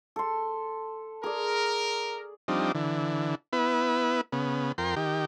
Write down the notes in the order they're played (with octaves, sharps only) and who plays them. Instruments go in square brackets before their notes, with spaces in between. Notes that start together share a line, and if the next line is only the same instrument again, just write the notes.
[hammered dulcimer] A4 C6
[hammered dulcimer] G#4 D5 [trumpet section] A#4
[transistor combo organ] F3 G3 C4 D4 D#4
D3 E3
B3 E4 B4
C#3 B3
F2 A#4 G5 C6
D#3 G4